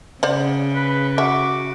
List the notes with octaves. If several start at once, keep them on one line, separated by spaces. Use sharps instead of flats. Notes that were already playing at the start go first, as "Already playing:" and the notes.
C#3 C5 D5 F#5
B4
F#4 E5 F#5 D6